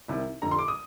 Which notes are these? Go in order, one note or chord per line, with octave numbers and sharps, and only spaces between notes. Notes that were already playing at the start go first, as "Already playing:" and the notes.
C2 C3 D#3
F1 F2 D3 A#5
C6
D6
D#6